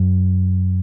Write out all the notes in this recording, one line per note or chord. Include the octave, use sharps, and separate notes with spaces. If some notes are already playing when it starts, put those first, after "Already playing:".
Already playing: F#2